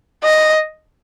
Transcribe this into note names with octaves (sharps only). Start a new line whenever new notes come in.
D#5